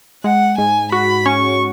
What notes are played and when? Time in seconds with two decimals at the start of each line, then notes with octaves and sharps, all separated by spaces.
0.24 G#3 F#5
0.58 G#2 G#5
0.92 F#4 B5
1.26 C#4 C#6